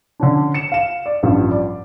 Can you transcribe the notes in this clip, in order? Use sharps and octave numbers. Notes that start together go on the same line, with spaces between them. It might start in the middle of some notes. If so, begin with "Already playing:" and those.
D3 C#4 D4
C#7 E7
F5 E7
D5
A1 G2 F3
D5